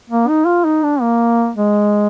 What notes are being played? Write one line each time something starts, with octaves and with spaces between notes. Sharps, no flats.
A#3
D#4
F4
D#4
D4
A#3
G#3